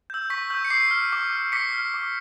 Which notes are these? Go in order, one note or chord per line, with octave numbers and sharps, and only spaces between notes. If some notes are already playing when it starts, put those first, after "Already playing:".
E6 G6
C#6 B6
E6 G6
C#7
D6 C7
F6
D6
F6
D6 B6 C#7
F6
D6